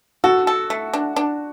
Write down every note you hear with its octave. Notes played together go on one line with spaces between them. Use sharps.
F#4 A4
A4
A3
D4
D4